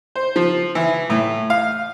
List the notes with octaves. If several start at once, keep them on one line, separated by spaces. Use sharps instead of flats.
C5
F3
E3
A2
F5